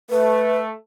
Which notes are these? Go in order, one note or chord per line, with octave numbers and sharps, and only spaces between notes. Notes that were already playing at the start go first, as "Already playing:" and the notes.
A3 B4